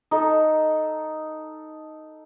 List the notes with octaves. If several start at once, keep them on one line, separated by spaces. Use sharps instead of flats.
D#4 A4